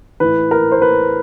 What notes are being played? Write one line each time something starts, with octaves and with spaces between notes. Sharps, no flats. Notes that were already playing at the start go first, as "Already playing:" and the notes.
A2 E3 B4
A#4
C5
B4